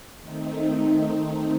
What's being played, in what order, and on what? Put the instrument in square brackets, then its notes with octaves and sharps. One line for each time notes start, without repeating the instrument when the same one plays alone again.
[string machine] D#3 A3 C4 D#4